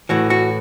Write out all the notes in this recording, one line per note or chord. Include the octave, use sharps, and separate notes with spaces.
A2 E3 F#4
F#4